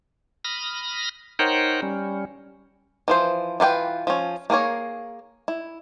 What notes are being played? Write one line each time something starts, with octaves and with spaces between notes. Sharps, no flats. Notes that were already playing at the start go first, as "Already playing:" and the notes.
B5 D#6 F6 A#6
D#4 A#4 C5 C#5 F#5 G5
G3 C#4
E3 F3 C5
E3 F4 B4 G5
F3 C#4
A#3 G#4 A#4 C#5
E4